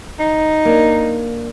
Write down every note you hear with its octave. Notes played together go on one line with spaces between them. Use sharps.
D#4
A#3 D4